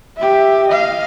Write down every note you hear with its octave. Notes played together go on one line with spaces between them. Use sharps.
G4 E5
D#5 F5